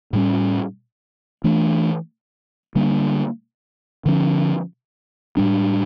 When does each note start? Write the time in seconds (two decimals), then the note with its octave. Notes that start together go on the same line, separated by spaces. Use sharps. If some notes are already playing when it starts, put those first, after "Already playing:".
0.13 A2 G3 C#4
1.44 E3 A3 D4
2.75 D3 G3 A#3 D4
4.06 D3 F3 C#4
5.37 A2 G3 D4